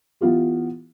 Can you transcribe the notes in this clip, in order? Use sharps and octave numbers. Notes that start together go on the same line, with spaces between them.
E3 B3 F4 G4